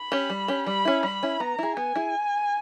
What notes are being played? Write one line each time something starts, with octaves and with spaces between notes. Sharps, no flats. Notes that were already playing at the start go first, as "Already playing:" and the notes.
Already playing: B5
C#4 G4
G3
C#4 G4
G3 B5
C#4 E4
G3 B5
C#4 E4
B3 A#5
E4 G#4
B3 G#5
E4 G#4